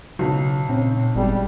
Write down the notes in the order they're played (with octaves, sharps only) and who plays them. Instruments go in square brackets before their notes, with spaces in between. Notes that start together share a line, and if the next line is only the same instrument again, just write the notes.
[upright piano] B1 F#3 [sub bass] C#3
[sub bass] A#2 [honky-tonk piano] C4 C#4
[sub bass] G#1 [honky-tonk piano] B2 G#3 [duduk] G3